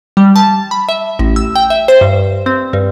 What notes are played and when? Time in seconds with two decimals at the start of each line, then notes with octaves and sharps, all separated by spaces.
0.17 G3
0.36 A5
0.71 B5
0.89 E5
1.19 A1
1.36 E6
1.56 G5
1.70 E5
1.88 C5
2.01 G2
2.46 C4
2.73 G2